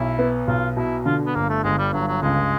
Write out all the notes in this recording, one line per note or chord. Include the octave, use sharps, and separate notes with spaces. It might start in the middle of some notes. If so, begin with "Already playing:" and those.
Already playing: B1 E4
B3
B1 F4
B2 E4
D3 F4
B3
G1 A#3
A3
G1 G#3
G3
G2 F#3
F#3
C#2 G#3